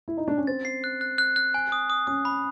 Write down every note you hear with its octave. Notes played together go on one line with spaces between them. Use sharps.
E4
D#4
D4
C#4
C4 A6
C7
F#6
F#6
F#6
F#6
G#5
D#6
D#6
C#4 D#6
B5